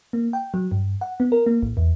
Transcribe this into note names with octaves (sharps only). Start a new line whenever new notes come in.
A#3
G5
F#3
G2
F#5
B3
A#4
A#3
A1
E2